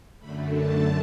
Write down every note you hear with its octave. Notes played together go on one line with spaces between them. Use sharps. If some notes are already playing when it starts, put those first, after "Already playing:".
F#2 D3 A3 B5
A5